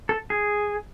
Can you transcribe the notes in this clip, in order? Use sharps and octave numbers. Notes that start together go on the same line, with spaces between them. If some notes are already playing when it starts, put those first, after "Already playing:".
A4
G#4